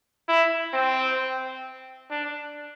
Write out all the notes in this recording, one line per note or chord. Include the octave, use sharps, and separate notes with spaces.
E4
C4
D4